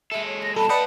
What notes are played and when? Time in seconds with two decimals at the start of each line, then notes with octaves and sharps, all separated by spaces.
0.12 G#3 A4 E5
0.26 C#5
0.43 A#6
0.56 B2 G3 A4 D#5 A5 B5
0.69 A3 B4 D5 D#5 F#5 G5